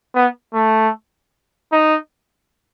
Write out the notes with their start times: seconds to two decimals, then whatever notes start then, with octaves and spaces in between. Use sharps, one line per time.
0.15 B3
0.54 A3
1.73 D#4